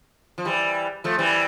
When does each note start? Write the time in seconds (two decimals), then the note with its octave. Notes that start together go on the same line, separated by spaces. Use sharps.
0.38 F3
0.45 E3 G3
1.04 F3 A3
1.19 E3 G3